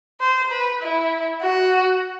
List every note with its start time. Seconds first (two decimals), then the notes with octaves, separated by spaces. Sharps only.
0.20 C5
0.51 B4
0.81 E4
1.41 F#4